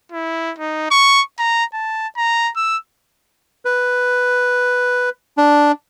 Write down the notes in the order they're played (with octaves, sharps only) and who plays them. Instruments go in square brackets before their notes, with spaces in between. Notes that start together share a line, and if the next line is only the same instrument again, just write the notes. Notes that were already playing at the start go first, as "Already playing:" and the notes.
[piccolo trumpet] E4
D#4
C#6
A#5
A5
A#5
E6
[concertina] B4
D4